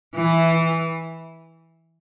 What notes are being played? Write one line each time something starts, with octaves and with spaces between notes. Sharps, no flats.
E3